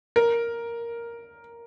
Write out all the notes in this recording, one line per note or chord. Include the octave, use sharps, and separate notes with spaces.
A#4